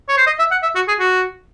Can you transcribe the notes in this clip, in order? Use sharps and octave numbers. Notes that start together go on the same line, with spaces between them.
C#5
C5
D#5
E5
F#5
E5
F#4
G#4
F#4